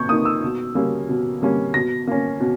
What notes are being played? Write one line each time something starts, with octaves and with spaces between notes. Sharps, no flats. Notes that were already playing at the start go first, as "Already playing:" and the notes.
Already playing: A#2 C#6 G6 G#6
A#3 D#4 D#6
E6
B2
G3 A#3 C#4
B2
G3 A#3 C#4
B2 A#6
A#3 C#4
B2